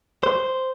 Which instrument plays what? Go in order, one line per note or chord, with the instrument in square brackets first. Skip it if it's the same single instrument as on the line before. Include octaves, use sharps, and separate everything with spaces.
[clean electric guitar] C5